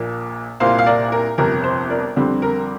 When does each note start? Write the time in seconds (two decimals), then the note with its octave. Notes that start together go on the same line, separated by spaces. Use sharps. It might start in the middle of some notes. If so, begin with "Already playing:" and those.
Already playing: A#1 A#2 A#3
0.60 C2 A#2 A#3 C5 F5
0.78 F5
0.86 A#4 D5
1.12 A#4
1.38 G1 F2 C3 A#4
1.64 C5
1.90 A#4 D5
2.16 F2 D3 G3 C4
2.42 A#4